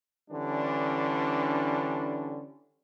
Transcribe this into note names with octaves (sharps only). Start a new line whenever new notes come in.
D3 E3 G3 C#4 D4